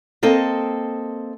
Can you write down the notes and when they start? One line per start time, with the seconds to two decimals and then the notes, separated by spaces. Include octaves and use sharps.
0.23 A#3 C4 A4 D#5